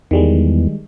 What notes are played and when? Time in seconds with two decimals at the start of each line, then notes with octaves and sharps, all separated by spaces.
0.11 E2 D#3 G3 G#3